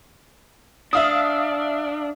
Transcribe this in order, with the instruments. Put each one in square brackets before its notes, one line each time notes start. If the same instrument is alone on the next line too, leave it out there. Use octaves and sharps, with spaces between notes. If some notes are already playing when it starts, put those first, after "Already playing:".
[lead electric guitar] D4 [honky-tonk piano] E5 F5 D#6